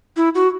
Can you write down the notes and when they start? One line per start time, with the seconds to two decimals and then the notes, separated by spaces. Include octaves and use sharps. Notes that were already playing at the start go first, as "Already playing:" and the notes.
0.17 E4
0.35 F#4